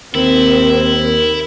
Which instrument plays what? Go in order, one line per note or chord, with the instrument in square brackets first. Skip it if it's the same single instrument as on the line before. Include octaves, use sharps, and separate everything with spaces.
[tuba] D#2 [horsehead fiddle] C4 [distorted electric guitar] E4 [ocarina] A#4